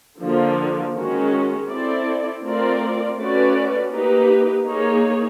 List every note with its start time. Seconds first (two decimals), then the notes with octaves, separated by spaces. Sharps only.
0.21 D3 F3 A#3
0.95 D#3 G#3 C#4 F#4
1.69 C4 E4 A4 D5
2.43 A3 C4 F4 A#4 D5
3.17 A3 C#4 F#4 B4 D5
3.91 A#3 D#4 G4 B4
4.65 A#3 D#4 G#4 C#5